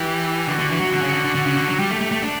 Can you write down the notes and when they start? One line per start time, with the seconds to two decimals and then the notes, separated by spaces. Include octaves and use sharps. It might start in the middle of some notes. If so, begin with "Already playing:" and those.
Already playing: E3 G4
0.48 D3 F#4
0.59 D3
0.69 E3
0.81 F#3
0.91 D3 F#4
1.02 C#3
1.14 D3
1.24 D3
1.35 D3
1.46 C#3
1.57 D3
1.68 F#3
1.79 G3 G4
1.90 A3
2.01 A3
2.12 A3
2.22 D4